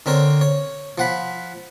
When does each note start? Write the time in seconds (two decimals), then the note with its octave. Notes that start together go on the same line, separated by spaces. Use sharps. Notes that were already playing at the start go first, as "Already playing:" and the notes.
0.06 D3 C4 A#4 C#5
0.41 C#5
0.98 F3 F#5 B5